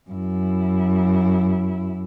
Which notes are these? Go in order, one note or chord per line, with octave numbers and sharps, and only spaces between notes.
F#2 E4